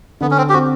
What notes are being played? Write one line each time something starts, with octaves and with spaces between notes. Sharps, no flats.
D3 B3
C#4
C4
G4
C4 F#4